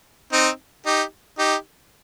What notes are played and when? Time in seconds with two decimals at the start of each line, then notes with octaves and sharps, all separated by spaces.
0.33 C4 D#4
0.86 D#4 G4
1.38 D#4 G4